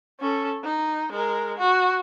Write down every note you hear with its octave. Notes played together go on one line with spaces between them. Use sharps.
C#4 A4
D#4
G#3 A#4
F#4